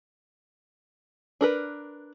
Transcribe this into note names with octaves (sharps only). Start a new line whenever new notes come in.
D4 A#4 B4